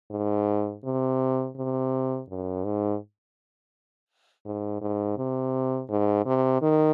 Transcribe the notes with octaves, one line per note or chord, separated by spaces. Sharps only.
G#2
C3
C3
F#2
G#2
G#2
G#2
C3
G#2
C3
D#3